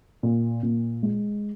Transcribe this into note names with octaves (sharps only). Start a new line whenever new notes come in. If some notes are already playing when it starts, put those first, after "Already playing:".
A#2
A#2
G#3